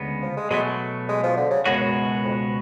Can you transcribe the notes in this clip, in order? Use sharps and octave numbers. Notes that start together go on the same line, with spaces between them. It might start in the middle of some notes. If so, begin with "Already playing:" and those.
Already playing: D2 C#3 G#3 B3
F3
G#3
B2 F#3 G#3 A3
G#3
F3
D3
C#3
C#2 F#2 B2 G#3 B3 F#4
F#2
F2